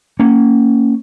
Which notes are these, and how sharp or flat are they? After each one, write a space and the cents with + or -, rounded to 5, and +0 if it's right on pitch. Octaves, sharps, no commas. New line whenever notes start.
A#3 -20 C#4 +0